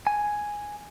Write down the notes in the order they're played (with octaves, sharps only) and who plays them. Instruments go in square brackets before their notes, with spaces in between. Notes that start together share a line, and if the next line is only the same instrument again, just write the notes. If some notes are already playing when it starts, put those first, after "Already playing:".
[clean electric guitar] G#5